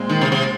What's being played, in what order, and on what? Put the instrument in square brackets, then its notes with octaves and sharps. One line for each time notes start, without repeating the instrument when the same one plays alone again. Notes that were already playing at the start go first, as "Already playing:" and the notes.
Already playing: [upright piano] A#2 G#3 C4
[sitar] D#3
C3
C3